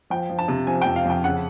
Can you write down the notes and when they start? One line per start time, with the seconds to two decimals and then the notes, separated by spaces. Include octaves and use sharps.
0.10 F3 G5
0.30 F3
0.39 A5
0.48 C3
0.67 F3 G#5
0.82 F2 G5
0.96 F5
1.05 F2 G5
1.24 C#3 F#5